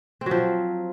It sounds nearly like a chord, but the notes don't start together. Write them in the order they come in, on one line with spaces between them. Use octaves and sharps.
C4 F#3 F3